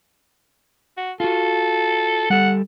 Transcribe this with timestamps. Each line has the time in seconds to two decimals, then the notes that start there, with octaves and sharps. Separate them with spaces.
0.97 F#4
1.20 F4 F#4 A4
2.30 G3 G4 A4 F#5